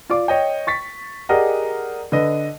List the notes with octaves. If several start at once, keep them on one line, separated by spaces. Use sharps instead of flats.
F4 D5 D6
C#5 D#5 G5
C#6 A6 B6
G4 G#4 A#4 D5 D#5 F#5
D3 B4 D#5